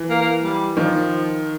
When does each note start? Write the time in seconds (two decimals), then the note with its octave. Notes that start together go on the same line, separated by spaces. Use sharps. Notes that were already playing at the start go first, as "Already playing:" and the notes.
Already playing: E3
0.10 A#3
0.21 A#3
0.43 G3
0.77 D#3 F3